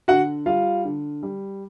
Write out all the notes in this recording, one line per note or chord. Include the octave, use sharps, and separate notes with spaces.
D3 F#4 F#5
G3 F4 F5
D3
G3